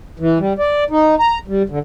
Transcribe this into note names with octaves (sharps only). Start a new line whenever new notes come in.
E3
G3
D5
D#4
A#5
G3
D3